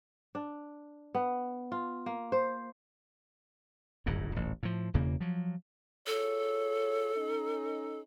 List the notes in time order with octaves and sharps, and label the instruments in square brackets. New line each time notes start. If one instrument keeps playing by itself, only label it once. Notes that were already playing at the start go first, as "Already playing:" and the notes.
[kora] D4
B3
F4
A#3
C5
[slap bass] D1 G1 F#2 A2
D#1 A1
A2 F3
E1 E2 C#3 A#3
F3 F#3
[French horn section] F4 G#4 C#5 [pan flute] A4
[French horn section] C#4 D#4